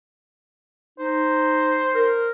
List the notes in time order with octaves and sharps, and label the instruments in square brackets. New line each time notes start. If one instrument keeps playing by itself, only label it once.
[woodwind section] D#4 [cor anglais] C5
[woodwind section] A#4